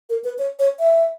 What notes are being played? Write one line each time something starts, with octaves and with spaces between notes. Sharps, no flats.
A#4
B4
C#5
C#5
E5